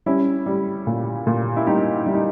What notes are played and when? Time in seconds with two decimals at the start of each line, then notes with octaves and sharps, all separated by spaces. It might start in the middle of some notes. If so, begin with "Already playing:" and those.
0.06 G3 C#4 E4
0.46 G3
0.87 A#2
1.27 A#2
1.57 E4
1.66 G3 D#4 G4
2.06 G3 E4
2.14 D#4